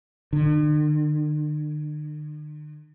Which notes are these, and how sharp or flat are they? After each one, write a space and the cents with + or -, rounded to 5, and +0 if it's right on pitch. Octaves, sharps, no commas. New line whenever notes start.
D3 +45